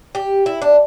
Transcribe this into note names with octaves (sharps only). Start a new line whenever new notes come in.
G4
E4
D4